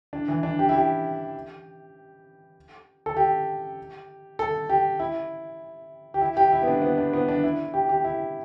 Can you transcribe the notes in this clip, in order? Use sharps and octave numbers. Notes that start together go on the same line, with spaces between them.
D4
E3
D4
G4
E4
G4
A4
G4
A4
G4
E4
G4
E4
G4
E4
B3
D4
B3
D4
B3
D4
E4
G4
G4
E4